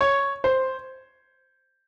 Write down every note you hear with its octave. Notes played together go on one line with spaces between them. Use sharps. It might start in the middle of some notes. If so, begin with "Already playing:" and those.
C#5
C5